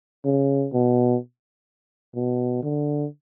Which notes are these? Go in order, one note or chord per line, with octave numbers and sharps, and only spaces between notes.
C#3
B2
B2
D3